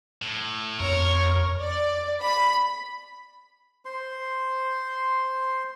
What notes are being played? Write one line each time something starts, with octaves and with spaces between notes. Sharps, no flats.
A2
F2 A#4 C#5
D5
B5
C5 C6